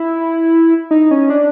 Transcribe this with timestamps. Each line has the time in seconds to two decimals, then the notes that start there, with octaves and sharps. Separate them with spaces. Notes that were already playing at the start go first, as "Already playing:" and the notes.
Already playing: E4
0.91 D#4
1.11 C#4
1.30 D4